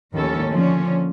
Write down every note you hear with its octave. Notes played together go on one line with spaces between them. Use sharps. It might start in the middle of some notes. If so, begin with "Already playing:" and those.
D#2 A2 F3 C#4 A4
D3 F3 A#3 C#4